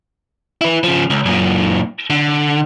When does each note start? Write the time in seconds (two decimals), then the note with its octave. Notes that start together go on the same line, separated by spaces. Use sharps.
0.61 E4 B4
0.83 C#3 F3
1.10 C#2
1.26 F#2 A#2
2.10 D3